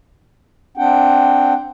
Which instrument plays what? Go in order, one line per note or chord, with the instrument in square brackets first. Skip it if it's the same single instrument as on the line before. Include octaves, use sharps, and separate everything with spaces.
[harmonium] C4 D4 F#5 G5